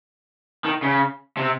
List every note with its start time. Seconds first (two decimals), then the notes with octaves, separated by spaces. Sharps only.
0.65 D#3
0.83 C#3
1.37 C3